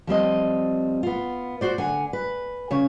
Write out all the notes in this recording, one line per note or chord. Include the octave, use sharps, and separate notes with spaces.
F3 G3 C4 D#5
B3 F4
F#4 C5 D5
D3 F#5 G#5
B4
C#3 C#5